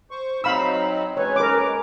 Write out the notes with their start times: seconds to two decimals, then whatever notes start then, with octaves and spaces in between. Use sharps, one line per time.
0.11 C5 C#6
0.44 F#3 C4 D#4 F5 B5 E6
1.17 G#3 C#4 B4 C#5
1.36 A#4 D6